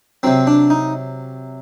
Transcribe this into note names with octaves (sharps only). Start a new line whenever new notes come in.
C3 F#3 C4
D4
D#4